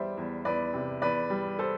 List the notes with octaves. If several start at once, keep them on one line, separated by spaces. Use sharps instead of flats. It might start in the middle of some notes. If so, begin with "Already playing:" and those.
Already playing: E2 G3 B4 C5 D5 E5
E2
E2 B4 D5
C3
E2 B4 D5
G3
A4 C5